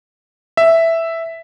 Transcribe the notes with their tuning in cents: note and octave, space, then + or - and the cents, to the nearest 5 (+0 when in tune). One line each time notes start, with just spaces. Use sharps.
E5 +0